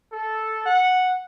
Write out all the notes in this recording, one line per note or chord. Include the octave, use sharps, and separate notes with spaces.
A4
F#5